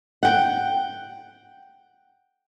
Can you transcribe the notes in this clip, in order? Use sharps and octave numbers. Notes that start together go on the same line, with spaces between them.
F#5 G5